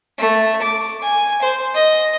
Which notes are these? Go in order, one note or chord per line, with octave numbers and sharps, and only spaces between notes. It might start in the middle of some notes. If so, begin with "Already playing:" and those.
A3
D6
G#5
C5
D#5